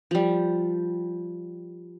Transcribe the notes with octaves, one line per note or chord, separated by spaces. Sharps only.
F3 G3